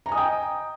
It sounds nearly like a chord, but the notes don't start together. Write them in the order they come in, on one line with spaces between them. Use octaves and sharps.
A#5 G#5 D#6 D#5 G5